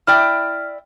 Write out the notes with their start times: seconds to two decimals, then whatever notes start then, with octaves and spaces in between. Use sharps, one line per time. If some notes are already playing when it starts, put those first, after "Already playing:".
0.07 E4 D5 G5 F6